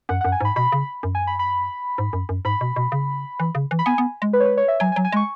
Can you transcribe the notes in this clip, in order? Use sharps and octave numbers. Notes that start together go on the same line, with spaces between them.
F#2 F#5
F#5
F#2
G#5
G#2 B5
B2 B5
C#3
F#2
G#5
B5
B5
G#2
F#2
F#2
G#2 B5
B2
B2
C#3
E3
C#3
E3
B5
B3 G#5
B3
G#3
B4
C#5
B4
C#5
E5
F#3 G#5
G#5
F#3
G#5
G#3 C#6